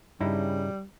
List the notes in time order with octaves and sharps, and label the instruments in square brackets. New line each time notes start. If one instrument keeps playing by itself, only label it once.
[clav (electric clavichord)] G2 D#4 E4 [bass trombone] C#3 [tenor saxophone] G3